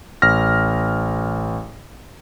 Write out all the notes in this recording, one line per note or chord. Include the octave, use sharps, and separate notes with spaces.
A1 F6 A#6